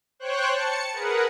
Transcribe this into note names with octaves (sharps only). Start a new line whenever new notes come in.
C5 C#5 G5 C#6 F#6
A5 C#7
G#4 A#4 B4 F#5